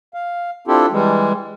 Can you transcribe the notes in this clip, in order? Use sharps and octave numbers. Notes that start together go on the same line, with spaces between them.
F5
C4 D4 E4 F4 G4 A4
E3 G3 G#3